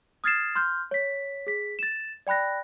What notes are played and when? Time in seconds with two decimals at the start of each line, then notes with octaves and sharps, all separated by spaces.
0.24 D#6 F6 G#6 A6 C7 E7
0.55 C6 F6 G6
0.91 C#5 B6
1.47 G#4 B6
1.79 A6 E7
2.27 D5 G5 B5 F#6 A#6